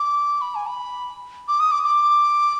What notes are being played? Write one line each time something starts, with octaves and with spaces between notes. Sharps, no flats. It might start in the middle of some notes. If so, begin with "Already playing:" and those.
Already playing: D6
B5
G#5
B5
D6
D#6
D6
D6